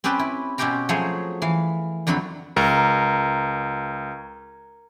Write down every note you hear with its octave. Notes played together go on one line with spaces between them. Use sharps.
C4 C#4 G4 B4 G5 A5
E4
B2 C4 C#4 G4 G5 A#5
F3 F#3 A3 G#4 C5 C#5
E3 F5
F2 D3 F#3 C4 B5
C#2 A#4